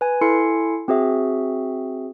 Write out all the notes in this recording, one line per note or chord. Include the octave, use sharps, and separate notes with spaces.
B4 G#5
E4 A4 G#5 C6 C7 C#7
C4 F#4 G#4 E5